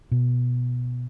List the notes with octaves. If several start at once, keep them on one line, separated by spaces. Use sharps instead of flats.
B2